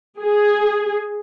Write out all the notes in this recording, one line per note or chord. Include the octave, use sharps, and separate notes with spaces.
G#4